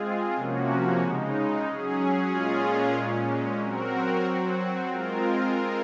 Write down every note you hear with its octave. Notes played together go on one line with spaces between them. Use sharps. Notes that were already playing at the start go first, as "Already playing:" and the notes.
Already playing: G#3 C4 F4 G#4
C3 F3 A#3 C#4 F#4
C#3 G#3 D#4
F#3 C#4 G#4
A#2 G#3 C#4 F4 G#4
A#2 G#3 C#4
F#3 C4 F#4 A#4
F#3 C4 F#4
G#3 C4 F4 A#4